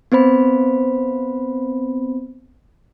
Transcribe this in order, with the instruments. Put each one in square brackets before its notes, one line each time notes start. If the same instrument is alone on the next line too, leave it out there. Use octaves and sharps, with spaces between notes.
[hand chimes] B3 C4 C5 B5